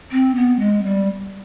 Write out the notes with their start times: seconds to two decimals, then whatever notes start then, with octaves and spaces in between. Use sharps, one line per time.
0.12 C4
0.35 B3
0.59 G#3
0.83 G3